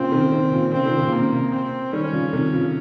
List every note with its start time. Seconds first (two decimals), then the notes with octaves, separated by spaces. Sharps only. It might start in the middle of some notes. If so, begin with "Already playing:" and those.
Already playing: A#2 C#3 C4
0.11 C3 D#3
0.32 C3 D#3
0.52 A#2 C#3
0.72 A#2 C#3 C4
0.86 C3 D#3
0.99 A#2 C#3
1.12 C3 A#3
1.33 C3
1.52 C4
1.93 D#3 G3 C#4
2.13 C#3 F3
2.33 C3 D#3
2.53 C#3 F3